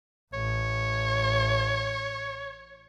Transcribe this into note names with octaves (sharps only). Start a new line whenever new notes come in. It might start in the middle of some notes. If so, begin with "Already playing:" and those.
A1 C#5